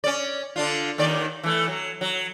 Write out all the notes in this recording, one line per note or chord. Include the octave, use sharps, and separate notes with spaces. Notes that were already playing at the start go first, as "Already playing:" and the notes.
C#4 D5
D3 D4 F4
D#2 D#3 D5
E3 A3
F#3
F#3